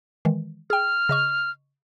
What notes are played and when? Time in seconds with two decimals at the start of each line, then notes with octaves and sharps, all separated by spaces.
0.25 D#3 E3 G#3
0.70 G#4 G5 F6
1.09 C#3 D#5 C#6